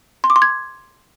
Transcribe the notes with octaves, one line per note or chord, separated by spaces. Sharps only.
C6
D6
C6
G#6